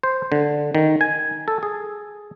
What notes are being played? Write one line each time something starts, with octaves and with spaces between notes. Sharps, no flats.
C5
D3
D#3
G#5
A4
G#4